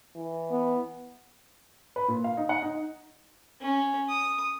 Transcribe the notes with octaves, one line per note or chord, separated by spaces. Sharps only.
E3
B3
B4
A#2
F5
D#4
F#5
D#4
C#4
D#6